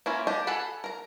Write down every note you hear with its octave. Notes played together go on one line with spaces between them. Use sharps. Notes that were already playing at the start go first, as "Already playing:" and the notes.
A#3 C#4 E4 F4
D4 G4 D#5 A5
G#4 A4 F#5 A5 B5
A#4 A#5